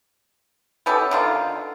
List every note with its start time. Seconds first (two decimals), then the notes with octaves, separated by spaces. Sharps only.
0.86 B3 C#4 G4 A4
1.11 D3 D#3 F4